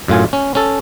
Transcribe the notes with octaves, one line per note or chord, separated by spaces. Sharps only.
F#2 A2 F4 G#5
C#4
C#4 A4